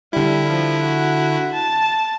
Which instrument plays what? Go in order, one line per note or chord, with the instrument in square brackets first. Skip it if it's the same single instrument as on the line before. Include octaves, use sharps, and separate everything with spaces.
[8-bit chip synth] D3 E4 [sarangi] G3
[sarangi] F3
F#4
A5